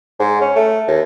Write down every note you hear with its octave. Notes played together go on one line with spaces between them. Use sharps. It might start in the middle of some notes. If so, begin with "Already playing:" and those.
G#2
C#4
A3
D#2